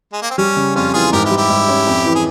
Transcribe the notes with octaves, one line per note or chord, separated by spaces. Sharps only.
G#3
A#3
C4
G3 C#4
C#3
F2 C#4 F4
E3 F4 G#4
G#2 G4 A#4
E4 G4
G3
E4 G4
G#2
C#4
F2
E3
G#4